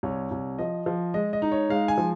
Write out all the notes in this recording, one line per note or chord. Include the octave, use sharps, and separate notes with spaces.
C2 C#5
C2
F3 D#5
F3
G#3 D#5
D#5
D#4
C#5
G#3 F5
G#5
F3